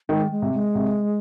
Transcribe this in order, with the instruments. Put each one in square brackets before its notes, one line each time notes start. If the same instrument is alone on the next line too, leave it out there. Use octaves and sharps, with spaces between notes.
[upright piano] D#3 [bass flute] G#3
[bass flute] G#3
[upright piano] C3
[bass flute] G#3
[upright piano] C3